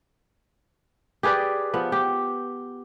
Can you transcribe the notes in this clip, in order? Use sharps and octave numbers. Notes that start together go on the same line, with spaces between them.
G4 G#4 B4 D5
F3 B3
G4